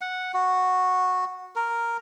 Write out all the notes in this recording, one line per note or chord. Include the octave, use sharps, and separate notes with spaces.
F#5
F#4
A#4